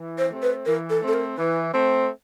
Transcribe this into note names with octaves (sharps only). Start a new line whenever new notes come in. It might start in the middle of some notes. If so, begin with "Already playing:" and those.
Already playing: E3
C5
A3 C4
B4
E3 A#4
A4
A3 C4
A4
A#4
E3 B4
A3 C4